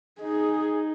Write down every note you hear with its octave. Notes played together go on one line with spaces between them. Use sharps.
D#4 G#4